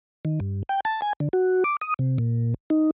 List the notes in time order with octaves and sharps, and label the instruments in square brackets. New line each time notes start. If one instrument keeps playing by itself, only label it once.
[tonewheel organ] D#3
G2
G5
A5
G#5
D3
F#4
D6
D#6
C3
A#2
D#4